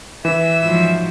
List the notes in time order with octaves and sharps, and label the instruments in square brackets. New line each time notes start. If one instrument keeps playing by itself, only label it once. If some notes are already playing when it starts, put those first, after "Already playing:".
[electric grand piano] E3 [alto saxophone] E5 [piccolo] E7
[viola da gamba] G#2 F3 F#3